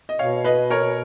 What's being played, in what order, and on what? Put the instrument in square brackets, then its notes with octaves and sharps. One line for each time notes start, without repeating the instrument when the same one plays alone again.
[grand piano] D#5
[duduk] B2 [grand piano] C#5 F5
[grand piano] B4 D#5
A#4 C#5